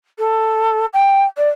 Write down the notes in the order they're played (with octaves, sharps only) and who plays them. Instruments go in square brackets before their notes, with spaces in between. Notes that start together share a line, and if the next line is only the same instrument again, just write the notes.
[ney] A4
G5
D5